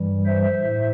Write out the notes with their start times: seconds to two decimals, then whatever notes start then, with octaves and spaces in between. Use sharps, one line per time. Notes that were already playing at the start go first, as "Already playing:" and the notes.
Already playing: G2 E3 G3
0.26 C5 E5
0.61 A2